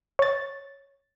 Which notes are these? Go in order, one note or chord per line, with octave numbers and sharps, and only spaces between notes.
C#5 A6